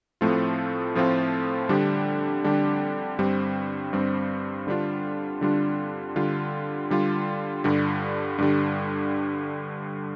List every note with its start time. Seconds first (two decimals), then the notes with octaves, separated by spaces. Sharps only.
0.21 A2 F3 A3 C4 F4
0.95 A2 F3 A3 C4 F4
1.69 D3 G3 D4 G4
2.44 D3 G3 D4 G4
3.19 G2 G3 C4
3.93 G2 G3 C4
4.67 D3 G3 D4 F4
5.41 D3 G3 D4 F4
6.16 D3 G3 F4
6.90 D3 G3 F4
7.64 G2 D3 G3
8.38 G2 D3 G3